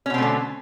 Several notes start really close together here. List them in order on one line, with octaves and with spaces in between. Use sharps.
C#4 B2 C4 A3 D3